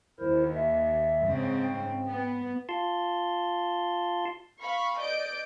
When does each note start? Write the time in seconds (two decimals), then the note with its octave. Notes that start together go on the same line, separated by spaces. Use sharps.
0.20 D#2 E4 A#4 C5
0.55 E5
1.26 G#2 C#3 C4
1.63 G5
2.06 B3
2.69 F4 A5 C6
4.61 F5 B5 C#6
4.98 D5 D#5 G6 D7